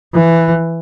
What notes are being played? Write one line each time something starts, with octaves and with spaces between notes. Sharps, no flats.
E3